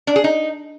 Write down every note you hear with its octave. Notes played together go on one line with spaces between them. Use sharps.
D4
G#4
D#4